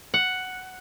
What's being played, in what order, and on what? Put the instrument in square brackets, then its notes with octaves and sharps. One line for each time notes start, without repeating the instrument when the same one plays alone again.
[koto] F#5